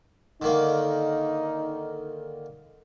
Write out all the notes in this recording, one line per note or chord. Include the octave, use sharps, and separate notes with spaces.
D3 D#3 A#3 D#4